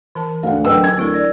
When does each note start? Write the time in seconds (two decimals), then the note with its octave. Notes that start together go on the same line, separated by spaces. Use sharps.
0.15 E3 A#4 A5
0.43 D2 F5 F#5
0.65 F#3 A#4 B4 G5 E6
0.84 G#6
0.97 D2 C4 E4 A#4
1.14 D5